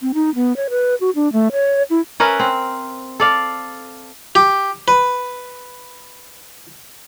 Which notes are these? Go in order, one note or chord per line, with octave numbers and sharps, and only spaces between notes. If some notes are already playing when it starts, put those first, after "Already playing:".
C4
D#4
B3
C#5
B4
F#4
D4
A3
C#5
E4
C#4 A#4 B4 E5
C4
A4 D5 F5
G4
B4